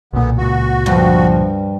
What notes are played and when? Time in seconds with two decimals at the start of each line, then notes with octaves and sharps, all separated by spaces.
0.13 B1 A#2 D3 B3
0.38 C#2 A#2 F#4
0.86 G2 F3